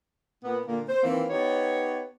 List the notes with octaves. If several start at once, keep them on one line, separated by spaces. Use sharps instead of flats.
A#2 A#3 B3
A#2 D3 A#3
C5
D#3 E3 A#3 C4
B3 D#4 G4 C#5